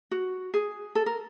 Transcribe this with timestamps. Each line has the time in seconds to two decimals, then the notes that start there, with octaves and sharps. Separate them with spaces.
0.11 F#4
0.54 G#4
0.95 A4
1.06 A#4